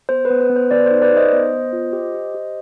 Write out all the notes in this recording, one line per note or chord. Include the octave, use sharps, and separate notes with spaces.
B3 C5
B4
B3
B4
B3
C5
B3 B4 D5
D#4 C5
B4 D5
D#4 C5 D#5
B3
B3
F4
G4
G4
G4